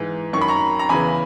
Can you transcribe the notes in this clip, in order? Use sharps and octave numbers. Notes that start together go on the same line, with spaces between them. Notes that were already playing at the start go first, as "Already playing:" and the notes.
Already playing: G#2 E3
F#2 D#3 C#6
B5
A#5 C#6
A#5
E2 C#3 E3 G#5 B5